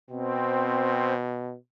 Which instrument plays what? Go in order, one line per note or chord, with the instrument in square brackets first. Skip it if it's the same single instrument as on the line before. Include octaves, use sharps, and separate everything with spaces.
[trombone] B2 [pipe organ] C4